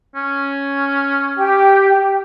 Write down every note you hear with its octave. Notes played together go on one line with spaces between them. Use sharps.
C#4
G4 G5